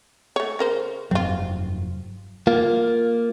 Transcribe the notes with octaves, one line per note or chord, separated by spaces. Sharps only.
A3 C#5
C#3 A#4 C5
F1 G2 F#3 C4 F4
A#3 F4